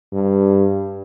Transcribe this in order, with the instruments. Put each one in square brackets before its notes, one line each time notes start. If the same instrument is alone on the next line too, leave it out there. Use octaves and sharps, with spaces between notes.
[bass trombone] G2